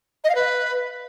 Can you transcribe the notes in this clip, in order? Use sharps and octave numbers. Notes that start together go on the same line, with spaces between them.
D#5
F5
B4